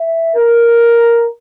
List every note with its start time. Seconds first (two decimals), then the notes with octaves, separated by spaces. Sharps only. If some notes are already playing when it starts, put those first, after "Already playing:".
Already playing: E5
0.37 A#4